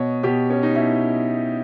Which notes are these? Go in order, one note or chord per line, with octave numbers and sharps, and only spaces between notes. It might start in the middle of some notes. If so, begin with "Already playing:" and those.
Already playing: B2 C#5 D#5
B2 G4
C#4
D#4
B2 E4